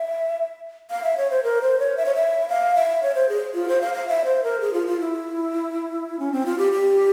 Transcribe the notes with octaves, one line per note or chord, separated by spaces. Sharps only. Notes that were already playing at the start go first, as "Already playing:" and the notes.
Already playing: E5
F5
E5
C#5
C5
A#4
C5
C#5
E5
C#5
E5
F5
E5
C#5
C5
G#4
F4
C5
F5
F5
E5
C5
A#4
G#4
F4
F4
E4
C#4
C4
F4
G4
G4